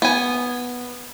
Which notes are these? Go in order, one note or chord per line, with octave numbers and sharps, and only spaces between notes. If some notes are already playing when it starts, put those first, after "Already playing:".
B3 G#5